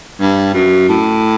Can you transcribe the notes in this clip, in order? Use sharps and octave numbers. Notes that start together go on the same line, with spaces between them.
G2
F#2
A2